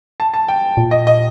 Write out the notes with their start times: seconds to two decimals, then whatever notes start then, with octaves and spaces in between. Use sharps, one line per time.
0.20 A5
0.34 A5
0.48 G5
0.77 A#2
0.91 D#5
1.07 D#5